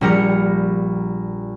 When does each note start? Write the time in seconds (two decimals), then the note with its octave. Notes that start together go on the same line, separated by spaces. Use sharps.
0.01 A#1 G3 A#4 C#7